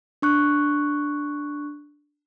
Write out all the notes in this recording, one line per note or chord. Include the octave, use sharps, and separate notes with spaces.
D4 C#6 F#6